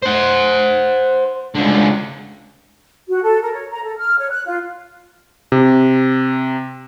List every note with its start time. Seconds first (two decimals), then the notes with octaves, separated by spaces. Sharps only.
0.03 C5 F#5
1.55 C#2 D3
3.08 F#4
3.23 A4
3.42 A#4
3.53 C#5
3.71 A#5
3.83 A4
3.97 F6
4.18 C#5
4.30 F#6
4.45 F4
5.52 C3